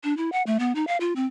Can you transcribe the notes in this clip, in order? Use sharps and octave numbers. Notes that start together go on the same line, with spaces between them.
D4
E4
F#5
A3
B3
D#4
F5
F4
C4